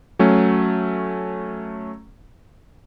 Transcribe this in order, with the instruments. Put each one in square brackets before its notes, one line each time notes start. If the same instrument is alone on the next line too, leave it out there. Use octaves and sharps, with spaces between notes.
[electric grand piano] F#3 A3 C#4